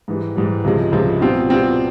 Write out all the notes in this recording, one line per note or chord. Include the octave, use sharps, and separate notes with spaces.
G#2 E3 G3
G#2 E3 G3
C#2 C3 F3 G#3
C#2 C3 F3 G#3
B2 G3 C4 F4
B2 G3 C4 F4